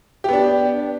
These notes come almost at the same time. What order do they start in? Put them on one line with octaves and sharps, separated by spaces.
G4 B3 D4